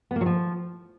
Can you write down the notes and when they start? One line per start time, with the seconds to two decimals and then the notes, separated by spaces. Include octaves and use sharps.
0.11 B3
0.16 A#3
0.21 F#3
0.26 F3